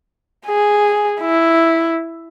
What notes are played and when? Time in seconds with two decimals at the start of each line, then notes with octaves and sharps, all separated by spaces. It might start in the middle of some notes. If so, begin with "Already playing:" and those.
0.47 G#4
1.21 E4